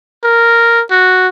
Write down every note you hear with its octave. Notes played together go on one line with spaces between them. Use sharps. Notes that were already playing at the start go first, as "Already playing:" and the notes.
A#4
F#4